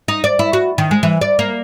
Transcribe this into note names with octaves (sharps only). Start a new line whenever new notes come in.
D#4
D5
E4
F#4
D#3
G#3
E3
D5
A#3